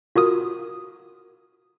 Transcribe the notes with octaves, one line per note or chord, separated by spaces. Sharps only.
F4 F#4 A#4 D#6